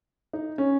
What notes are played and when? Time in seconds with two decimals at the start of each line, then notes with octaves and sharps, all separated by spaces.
0.33 D#4
0.58 C#4